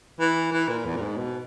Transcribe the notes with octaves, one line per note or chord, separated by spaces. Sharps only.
E3
E3
A#2
E2
A#2
G#2
B2